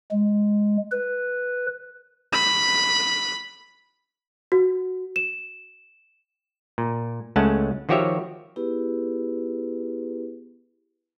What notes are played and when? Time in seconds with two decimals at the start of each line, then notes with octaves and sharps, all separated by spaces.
0.11 G#3
0.92 B4
2.33 B5
4.52 F#4
5.16 E7
6.78 A#2
7.36 C#2 G#3 A3 C#4 F#5 A5
7.89 D#3 F3 F#4 G4 C#5 E5
8.56 B3 E4 G4 G#4 B4